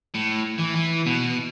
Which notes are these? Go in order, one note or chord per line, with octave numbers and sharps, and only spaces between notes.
A2
E3
E3
B2